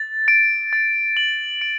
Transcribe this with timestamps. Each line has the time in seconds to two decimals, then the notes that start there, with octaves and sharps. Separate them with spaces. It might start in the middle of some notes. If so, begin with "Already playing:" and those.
Already playing: A6
0.28 D7
0.73 A6
1.17 F#7
1.61 D7